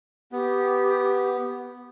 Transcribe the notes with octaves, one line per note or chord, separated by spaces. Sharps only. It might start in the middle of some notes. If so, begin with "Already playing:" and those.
B3 G4